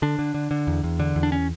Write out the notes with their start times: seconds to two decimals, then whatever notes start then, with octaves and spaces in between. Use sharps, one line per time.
0.02 D3 D4
0.19 D3
0.34 D3
0.51 D3
0.67 E2
0.83 E2
1.00 D3
1.16 E2
1.23 D4
1.32 C#4